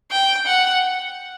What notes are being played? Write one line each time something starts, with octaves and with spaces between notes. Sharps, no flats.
G5
F#5